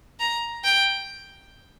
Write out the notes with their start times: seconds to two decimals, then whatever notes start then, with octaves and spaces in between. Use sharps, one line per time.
0.20 A#5
0.64 G5